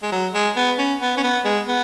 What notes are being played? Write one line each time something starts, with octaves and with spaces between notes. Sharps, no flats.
G#3
F#3
G#3
B3
C#4
B3
C#4
B3
G#3
B3